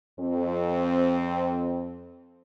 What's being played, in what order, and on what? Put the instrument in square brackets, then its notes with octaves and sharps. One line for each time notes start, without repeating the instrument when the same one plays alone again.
[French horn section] F2 C4